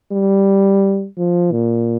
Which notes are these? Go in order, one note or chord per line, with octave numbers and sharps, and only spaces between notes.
G3
F3
A#2